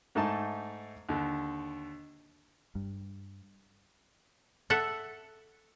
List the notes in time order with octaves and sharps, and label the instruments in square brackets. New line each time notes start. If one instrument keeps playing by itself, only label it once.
[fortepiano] G#2 A3 D#4 E5 A5
D#2 D3
[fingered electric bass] G2
[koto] A4 E5 F#5